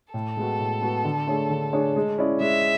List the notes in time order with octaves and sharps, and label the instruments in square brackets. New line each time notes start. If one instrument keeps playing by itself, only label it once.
[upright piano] A2 [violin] A4
[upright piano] G#3 B3 F#4
A2
G#3 B3 F#4
D3
A3 D4 G#4 C#5
D3
A3 D4 G#4 C#5
G#3
C#4 E4 G#4 D5
[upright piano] G#3 [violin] E5